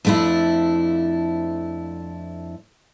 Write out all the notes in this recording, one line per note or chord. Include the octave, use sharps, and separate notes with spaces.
F2 F3 A3 D4 E4